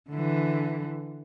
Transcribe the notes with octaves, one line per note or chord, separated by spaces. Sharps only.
D3 E3